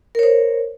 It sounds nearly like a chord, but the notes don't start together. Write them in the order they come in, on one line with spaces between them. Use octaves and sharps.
A#4 C#5 C5